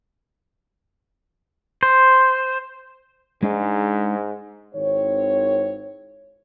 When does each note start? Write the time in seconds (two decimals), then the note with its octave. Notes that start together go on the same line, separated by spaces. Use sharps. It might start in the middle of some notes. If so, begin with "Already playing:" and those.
1.83 C5
3.43 G#2 G#3 D4 D#4
4.73 G#1 D#3 C4 E4 C#5